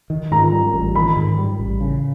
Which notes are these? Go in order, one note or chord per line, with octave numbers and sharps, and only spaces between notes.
D#3
G#2 A#5
G3
A1
D#3 B5
G#2
G3
A1
C#3